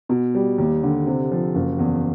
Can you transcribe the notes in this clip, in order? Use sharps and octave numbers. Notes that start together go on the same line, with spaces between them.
B2
G3
D#2
D3
C3
F3
F#1
E2